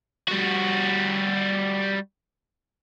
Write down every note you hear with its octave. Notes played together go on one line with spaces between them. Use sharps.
G3 F#4